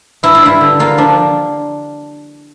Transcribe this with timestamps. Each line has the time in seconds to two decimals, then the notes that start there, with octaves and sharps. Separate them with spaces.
0.23 G2 E4
0.35 F4
0.43 G2 E4
0.61 D3
0.79 A#3 F4
0.98 F3 D4